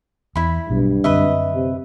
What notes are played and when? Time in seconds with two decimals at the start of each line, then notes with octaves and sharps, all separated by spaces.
0.36 E2 E4 B5
0.70 B1 G2 B2
1.04 F#2 D3 C4 B4 D#5 E5
1.54 C3